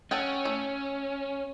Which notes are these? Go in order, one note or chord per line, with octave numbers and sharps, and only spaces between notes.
C#4 A4 F#5 G5
A3